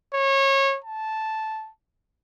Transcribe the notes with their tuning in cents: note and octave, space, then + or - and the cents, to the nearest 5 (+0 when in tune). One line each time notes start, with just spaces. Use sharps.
C#5 -25
A5 -10